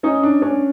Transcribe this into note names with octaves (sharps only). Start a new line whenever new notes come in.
C#4 D#4
D4
C#4 D4